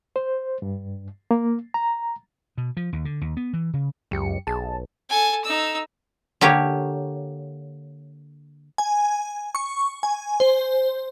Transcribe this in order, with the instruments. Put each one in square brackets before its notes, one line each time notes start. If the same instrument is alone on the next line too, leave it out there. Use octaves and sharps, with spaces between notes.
[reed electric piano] C5
G2
A#3
A#5
[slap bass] B2
F3
D#2
D3
D#2
B3
E3
C#3
[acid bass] C#2 [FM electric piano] F#2 G4 C#7
[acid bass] B1 [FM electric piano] G#4 A5
[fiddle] A4 G#5
D#4 E6
[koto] D3 A#3 G4 C#5
[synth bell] G#5
C#6
G#5
C5